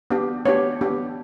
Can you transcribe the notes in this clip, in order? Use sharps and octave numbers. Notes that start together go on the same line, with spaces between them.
B3 D4 G4
B3 D4 G4 C#5
B3 D4 G4